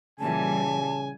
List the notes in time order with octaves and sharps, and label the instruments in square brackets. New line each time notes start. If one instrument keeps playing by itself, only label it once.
[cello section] A#2 E3 G3 [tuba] C#3 [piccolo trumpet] G#5 [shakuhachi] A5